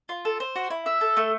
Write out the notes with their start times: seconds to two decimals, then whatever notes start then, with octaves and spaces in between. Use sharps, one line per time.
0.09 F4
0.25 A4
0.40 C5
0.56 F#4
0.70 E4
0.86 E5
1.01 A4
1.17 A3